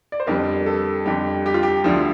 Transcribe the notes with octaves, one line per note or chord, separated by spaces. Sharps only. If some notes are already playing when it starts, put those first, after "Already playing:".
D5
C5
F2 D3 G3 A#4
A4
F2 D3 G3 G4
G4
F4
G4
D2 D3 F3 F4